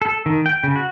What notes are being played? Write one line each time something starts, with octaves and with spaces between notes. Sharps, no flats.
A4
D#3
G5
C#3
F#4